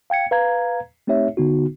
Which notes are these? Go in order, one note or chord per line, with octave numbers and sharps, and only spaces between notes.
F5 G5 G#6 C#7
B4 F5 A#5 G#6
A3 C4 D#4 G4 C#5 E5
G#1 D3 B3 D#4 F#4